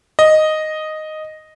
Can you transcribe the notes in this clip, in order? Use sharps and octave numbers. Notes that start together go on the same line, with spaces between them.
D#5